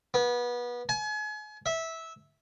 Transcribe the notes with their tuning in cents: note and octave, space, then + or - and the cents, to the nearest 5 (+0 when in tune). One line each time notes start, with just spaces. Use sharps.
B3 -25
G#5 +35
E5 -15